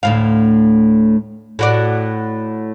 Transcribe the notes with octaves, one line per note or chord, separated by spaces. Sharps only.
D2 A2 F5
A2 F#4 D5